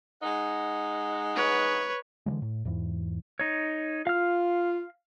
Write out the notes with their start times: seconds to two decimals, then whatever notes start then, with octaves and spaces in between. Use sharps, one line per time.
0.22 G#3 D#4 F#5
1.36 B4 C#5
2.26 D3 E3 F3 G#3
2.42 A2
2.65 E2 G#2 E3
3.39 D#4 C#5
4.07 F4 F5 F6